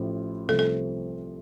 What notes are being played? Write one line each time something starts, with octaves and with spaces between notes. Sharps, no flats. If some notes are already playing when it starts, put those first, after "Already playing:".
Already playing: A1 A2 F3
C2 C3 F3 A3 C4 A4
A4